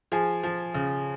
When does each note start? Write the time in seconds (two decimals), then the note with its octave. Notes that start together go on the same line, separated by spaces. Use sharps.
0.12 F3 G#4
0.43 F3
0.74 C#3